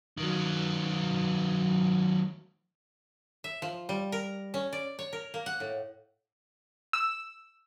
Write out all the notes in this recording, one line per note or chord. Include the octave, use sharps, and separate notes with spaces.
D#3 F#3
E5
F3
G3
A#4
C#4
D5
C#5
A#4
A#3
F#5
A2
E6